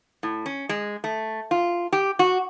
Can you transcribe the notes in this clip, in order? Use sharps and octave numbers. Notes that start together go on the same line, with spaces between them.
A2
C#4
G#3
A3
F4
G4
F#4